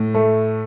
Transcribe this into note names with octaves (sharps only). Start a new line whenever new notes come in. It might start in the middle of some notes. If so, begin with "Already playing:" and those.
Already playing: A2
A3